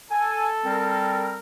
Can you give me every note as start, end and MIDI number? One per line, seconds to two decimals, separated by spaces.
0.11 1.38 69
0.11 0.47 80
0.65 1.38 55
0.65 1.38 60
0.65 1.38 70